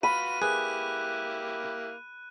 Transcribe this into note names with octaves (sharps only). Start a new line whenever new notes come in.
F4 F#4 B4 B5 D#7
A#3 E4 G4 G#4 B4 F#6